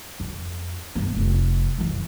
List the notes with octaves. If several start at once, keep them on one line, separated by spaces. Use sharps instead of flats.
F2
G1 B3
F1
F#2 E3